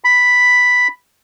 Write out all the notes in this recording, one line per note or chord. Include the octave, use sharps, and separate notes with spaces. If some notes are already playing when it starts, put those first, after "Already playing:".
B5